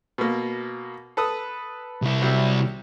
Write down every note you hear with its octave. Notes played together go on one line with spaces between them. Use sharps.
B2 A#3
A4 B4 D#6
C2 E4
C3 F#3 G3